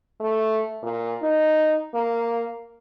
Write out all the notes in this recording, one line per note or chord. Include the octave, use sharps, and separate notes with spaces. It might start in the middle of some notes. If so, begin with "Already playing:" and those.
A3
A#2
D#4
A#3